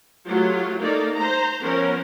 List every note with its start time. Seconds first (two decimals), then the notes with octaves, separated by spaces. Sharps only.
0.25 F#3 A3 F4 G4
0.79 A3 A#3 D#4 A4 D5
1.14 C5 A#5
1.62 F3 B3 C#4 A#4 C5